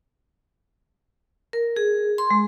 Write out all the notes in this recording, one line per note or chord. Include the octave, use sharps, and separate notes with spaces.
A#4
G#4
C6
G#3